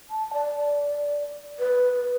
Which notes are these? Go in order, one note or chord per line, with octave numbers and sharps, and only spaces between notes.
A5
D5
B4